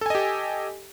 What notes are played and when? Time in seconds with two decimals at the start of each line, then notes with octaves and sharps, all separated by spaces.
0.01 A4
0.06 G#5
0.10 D#5
0.15 G4